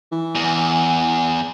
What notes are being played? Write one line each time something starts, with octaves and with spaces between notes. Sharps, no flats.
E3
E2